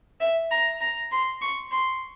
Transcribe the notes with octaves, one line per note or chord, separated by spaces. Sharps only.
E5
A#5
A#5
C6
C#6
C6